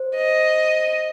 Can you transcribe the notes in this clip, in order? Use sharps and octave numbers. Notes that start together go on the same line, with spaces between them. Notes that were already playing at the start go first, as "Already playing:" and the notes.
Already playing: C5
D#5